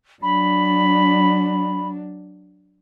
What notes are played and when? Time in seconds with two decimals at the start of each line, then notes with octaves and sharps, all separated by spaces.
0.22 F#3 D4 B5